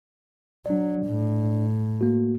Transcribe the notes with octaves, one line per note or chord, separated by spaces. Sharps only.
F#3 D4 D5
A2
A#3 F#4